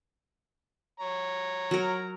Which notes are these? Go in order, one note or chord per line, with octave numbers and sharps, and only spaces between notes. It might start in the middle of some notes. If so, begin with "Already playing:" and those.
C#5 A#5
F#3 A#4